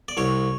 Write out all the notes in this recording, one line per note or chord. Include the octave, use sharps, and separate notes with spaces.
D5
C2 C#5